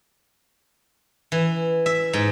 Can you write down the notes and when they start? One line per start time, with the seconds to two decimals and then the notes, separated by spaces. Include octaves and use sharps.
1.32 E3
1.86 E5
2.13 G#2